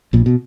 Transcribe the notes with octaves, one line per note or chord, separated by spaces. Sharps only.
A#1 A#2
B2